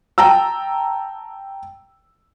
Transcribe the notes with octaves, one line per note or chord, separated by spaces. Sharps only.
G5 A5 A#5 E6